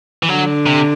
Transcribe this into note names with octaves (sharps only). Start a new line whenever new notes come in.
E3
D3 F#3
C3